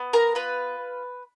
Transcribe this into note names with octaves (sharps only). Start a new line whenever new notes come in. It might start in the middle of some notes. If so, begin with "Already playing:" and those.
Already playing: B3
A#4 A#5
F4 B4